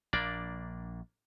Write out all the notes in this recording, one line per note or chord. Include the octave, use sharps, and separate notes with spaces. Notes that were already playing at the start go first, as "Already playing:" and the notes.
A#1 A#3 D4 D5